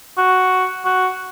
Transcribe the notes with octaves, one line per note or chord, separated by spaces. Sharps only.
F#4
F#4